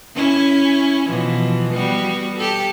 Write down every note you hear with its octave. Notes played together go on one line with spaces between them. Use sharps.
C#4 E4
B2 E3 F3
G3 B3 F#4
G4 A4